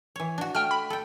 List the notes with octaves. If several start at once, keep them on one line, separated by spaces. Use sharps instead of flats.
E3 C#5
D4 F#4
A3 G5 F6
B5
A4 G5